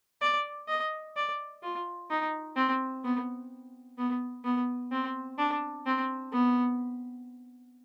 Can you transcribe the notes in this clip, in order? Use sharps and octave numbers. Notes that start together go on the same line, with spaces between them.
D5
D#5
D5
F4
D#4
C4
B3
B3
B3
C4
D4
C4
B3